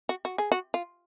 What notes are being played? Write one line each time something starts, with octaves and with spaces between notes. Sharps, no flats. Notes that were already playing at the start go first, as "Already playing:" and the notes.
F#4
F#4
G#4
F#4
F4